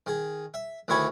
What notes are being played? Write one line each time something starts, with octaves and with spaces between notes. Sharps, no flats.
D#3 G#4
E5
D2 D#3 E4 C#5 G#5 B5